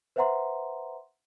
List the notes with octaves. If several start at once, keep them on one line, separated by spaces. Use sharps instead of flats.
B4 C5 E5 F#5 A#5 C6